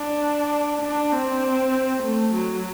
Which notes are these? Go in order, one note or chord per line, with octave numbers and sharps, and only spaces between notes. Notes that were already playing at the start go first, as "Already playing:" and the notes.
Already playing: D4
D4
C4
A3
F#3